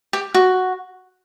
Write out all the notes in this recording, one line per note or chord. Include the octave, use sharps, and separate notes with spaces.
G4
F#4